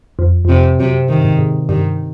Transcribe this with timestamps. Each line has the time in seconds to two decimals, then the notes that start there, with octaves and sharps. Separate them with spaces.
0.19 F2
0.45 F2 C3
0.79 F#2 C3
1.09 G2 D#3
1.24 G#2
1.39 G#2
1.69 G2 D#3